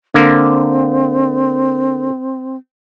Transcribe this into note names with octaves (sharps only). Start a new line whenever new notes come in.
D3 A#3 C4